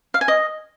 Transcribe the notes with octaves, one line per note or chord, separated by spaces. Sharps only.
F5
G#5
D#5